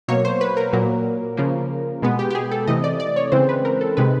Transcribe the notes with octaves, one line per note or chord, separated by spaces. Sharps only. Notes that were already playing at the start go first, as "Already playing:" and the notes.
B2 F#3 A#3 C#5
C5
B4
A#4
A#2 F#3 A#3
C#3 F3 A#3
B2 G#3 B3
G4
G4
G#4
A4
C3 E3 A3 D#5
D5
D5
C#5
C#3 E3 G#3 C4 C5
B4
A#4
A4
C3 D#3 G#3 B4